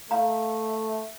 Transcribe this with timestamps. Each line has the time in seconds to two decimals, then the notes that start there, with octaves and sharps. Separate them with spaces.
0.11 A3 F5 A#5